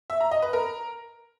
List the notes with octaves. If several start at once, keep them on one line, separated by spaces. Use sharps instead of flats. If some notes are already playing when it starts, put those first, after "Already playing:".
E5
A#5
D#5
B4
A#4